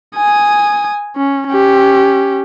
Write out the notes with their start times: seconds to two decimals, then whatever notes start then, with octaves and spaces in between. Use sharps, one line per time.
0.16 G#5 D#6
1.17 C#4
1.47 C#4 G4